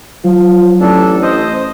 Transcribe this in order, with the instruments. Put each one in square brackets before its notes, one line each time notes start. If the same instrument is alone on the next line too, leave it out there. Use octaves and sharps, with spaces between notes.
[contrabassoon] F3 [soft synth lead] F#3
[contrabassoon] A1 [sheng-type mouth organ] D4 A4
[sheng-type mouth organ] C5 D#5 [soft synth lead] D#6